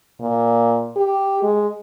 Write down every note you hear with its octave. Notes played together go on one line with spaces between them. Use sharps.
A#2
G4
G#3